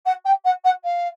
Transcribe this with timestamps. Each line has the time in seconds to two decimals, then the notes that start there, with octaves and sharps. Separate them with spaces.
0.05 F#5
0.25 G5
0.44 F#5
0.64 F#5
0.83 F5